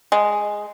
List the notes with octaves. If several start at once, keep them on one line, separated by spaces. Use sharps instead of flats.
G#3